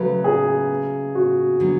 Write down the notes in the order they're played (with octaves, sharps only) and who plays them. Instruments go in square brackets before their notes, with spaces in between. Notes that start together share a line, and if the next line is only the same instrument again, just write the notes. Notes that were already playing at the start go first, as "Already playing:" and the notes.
Already playing: [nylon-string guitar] C#3 F#3 A3 [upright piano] B4
[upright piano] G#4
F#4
[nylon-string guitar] D3 F#3 B3